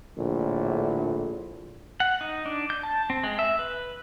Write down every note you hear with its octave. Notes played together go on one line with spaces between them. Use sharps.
A#1 A2 D3
F#5
D#4
D4
G6
A5
C4
G#3
E5
B4